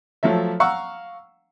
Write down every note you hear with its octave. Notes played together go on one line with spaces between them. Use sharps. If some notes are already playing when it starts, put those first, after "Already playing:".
F3 F#3 A3 E5
F5 F#5 A#5 C#6 E6